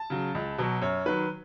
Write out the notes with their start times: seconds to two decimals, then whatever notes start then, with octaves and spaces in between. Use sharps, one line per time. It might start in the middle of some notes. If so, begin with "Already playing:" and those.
Already playing: A5
0.10 C#3 F#3
0.35 C#2
0.58 B2 F#3
0.82 F#2 C#5
1.06 D#3 F#3 B4